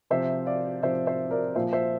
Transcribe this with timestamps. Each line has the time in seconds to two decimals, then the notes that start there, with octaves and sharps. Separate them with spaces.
0.10 C3 F3 C5 E5
0.46 D5 F5
0.82 C3 F3 C5 E5
1.06 C5 E5
1.31 A#4 D5
1.55 A#2 F3 C5 E5
1.73 C5 E5